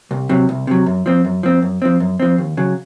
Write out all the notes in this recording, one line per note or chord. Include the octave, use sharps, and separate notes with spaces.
C2
C3 F#3
C2
C3 F#3
F#2
F3 C4
F#2
F3 C4
F#2
F3 C4
F#2
F3 C4
D#2
C#3 F#3